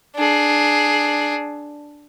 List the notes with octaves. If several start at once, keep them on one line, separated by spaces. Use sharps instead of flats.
D4 G#4